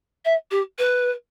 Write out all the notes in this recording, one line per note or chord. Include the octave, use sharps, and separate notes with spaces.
E5
G4
B4